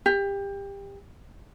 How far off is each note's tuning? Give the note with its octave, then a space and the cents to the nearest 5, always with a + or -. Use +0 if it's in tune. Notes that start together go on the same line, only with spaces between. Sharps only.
G4 +25